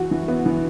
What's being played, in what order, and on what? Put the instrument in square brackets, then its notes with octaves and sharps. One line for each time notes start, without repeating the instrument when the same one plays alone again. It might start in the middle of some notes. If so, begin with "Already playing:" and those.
Already playing: [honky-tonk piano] E3 F#4
E3
B3
E3